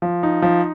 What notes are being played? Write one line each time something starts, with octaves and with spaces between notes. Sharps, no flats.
F3
D#4
F3